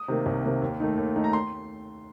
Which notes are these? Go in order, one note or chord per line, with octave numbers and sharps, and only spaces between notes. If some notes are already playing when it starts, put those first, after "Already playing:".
Already playing: D#6
C3 D#3 A#3
C2
C3 D#3 A#3
D#2
D#3 A3 D#4
D#2
D#3 A3 D#4
A#5
C6